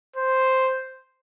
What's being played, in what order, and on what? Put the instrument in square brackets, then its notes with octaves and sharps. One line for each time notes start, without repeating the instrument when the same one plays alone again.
[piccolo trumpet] C5